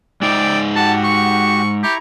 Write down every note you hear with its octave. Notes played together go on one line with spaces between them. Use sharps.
G#3 D#4 D5 E5 G5 E6
F#4 G4 F#5 A5
C#6
E4 G4 A#5 C#6